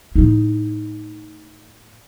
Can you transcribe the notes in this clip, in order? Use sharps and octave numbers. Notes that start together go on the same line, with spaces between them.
A2 D#4